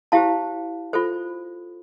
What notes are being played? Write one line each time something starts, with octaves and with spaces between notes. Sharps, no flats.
E4 G4 C5 F5 A5
F4 A4 C5